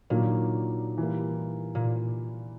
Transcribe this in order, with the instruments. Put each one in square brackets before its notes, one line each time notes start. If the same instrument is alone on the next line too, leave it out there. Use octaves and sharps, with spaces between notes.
[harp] A#2 [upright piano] D#3 F#3 A#3 D4
[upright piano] E3 G3 A#3
[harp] A#2